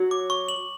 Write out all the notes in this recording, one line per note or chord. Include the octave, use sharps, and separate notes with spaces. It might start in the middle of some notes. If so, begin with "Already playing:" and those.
Already playing: F#3
D6
C#6
F#7